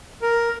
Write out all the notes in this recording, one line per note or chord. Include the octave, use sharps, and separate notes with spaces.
A#4